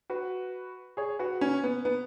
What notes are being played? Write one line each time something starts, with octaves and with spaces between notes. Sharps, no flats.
F#4 B4
G#4 C#5
F#4 B4
C#4
B3
B3